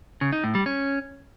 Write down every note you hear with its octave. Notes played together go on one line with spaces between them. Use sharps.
C#3
D#4
A2
G3
C#4